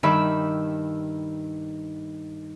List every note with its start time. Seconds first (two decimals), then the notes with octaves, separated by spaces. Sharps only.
0.03 G2 D#3 E5 B5 E6